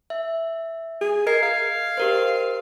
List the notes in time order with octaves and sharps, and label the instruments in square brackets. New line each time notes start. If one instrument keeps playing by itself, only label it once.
[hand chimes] E5
[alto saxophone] G#4
[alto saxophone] A#4 [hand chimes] D#5 G#6 C7
[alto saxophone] F5
[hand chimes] G4 A#4 C5